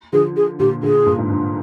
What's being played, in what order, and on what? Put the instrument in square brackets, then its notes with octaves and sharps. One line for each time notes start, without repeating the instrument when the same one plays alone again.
[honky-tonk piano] D3 F3 [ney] G#4
[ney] G#4
[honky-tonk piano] A#2 D3 [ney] G4
[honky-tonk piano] A#2 D3 [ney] G#4
[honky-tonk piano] G2 A#2
G#2
G2